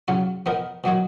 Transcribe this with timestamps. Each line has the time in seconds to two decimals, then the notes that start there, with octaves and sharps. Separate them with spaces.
0.08 C#3 F#3 C#4 F4
0.46 F3 B3 D#4 A#4
0.84 B2 F#3 A#3 D#4 F#4